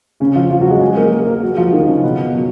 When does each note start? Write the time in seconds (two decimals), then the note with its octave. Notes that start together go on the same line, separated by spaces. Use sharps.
0.20 C#3 C#4
0.35 F3 F4
0.51 F3 F4
0.61 F#3 F#4
0.71 G#3 G#4
0.81 G#3 G#4
0.96 A#3 A#4
1.11 A#3 A#4
1.27 A#3 A#4
1.43 F#3 F#4
1.57 F3 F4
1.73 D#3 D#4
1.88 C#3 C#4
2.03 B2 B3
2.34 F#3